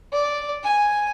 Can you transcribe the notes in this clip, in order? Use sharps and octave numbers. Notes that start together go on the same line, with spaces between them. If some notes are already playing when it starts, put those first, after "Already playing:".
D5
G#5